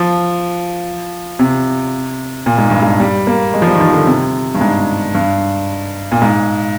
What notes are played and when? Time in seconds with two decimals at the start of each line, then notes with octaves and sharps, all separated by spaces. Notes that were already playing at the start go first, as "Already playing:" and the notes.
Already playing: F3
1.39 C3
2.46 A#2
2.58 G#2
2.70 G2
2.82 G#2
3.00 G3
3.27 A#3
3.54 G#3
3.62 F3
3.67 G3
3.74 D#3
3.80 F3
3.93 D3
4.07 C3
4.55 G2
4.61 G#2
5.15 G2
6.12 A#2
6.22 G#2